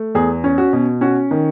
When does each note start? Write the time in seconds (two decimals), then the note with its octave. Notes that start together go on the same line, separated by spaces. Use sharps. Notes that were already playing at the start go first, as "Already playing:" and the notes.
Already playing: A3
0.15 E2 G#4
0.44 C#4
0.58 F#4
0.73 B2
1.01 C#4 F#4
1.31 D#3